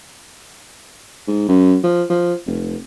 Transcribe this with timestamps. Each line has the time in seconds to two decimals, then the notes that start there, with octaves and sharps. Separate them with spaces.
1.27 G#2
1.49 F#2
1.84 F3
2.10 F3
2.46 F1